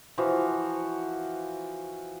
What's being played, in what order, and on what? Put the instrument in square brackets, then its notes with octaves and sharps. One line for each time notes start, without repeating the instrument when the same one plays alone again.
[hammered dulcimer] E3 F3 F#4